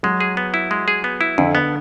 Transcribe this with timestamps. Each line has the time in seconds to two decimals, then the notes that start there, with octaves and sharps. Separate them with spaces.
0.03 F#3 G#3
0.20 G#4
0.37 B3
0.54 E4
0.71 G#3
0.88 G#4
1.04 B3
1.21 E4
1.38 F2 D3
1.55 B3